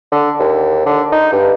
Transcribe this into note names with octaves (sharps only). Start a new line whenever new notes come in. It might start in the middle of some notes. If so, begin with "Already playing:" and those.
D3
D#2
D3
D#4
G2